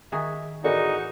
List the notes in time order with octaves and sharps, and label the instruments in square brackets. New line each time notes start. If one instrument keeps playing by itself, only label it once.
[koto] D#3 F#4 G#4 [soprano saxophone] E5
[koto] A2 E3 [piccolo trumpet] D#4 [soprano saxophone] F#4 [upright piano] G#4 A#4 D5